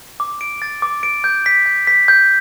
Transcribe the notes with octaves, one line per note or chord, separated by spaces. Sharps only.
D6
D7
A6
D6
D7
G6
B6
G6
B6
G6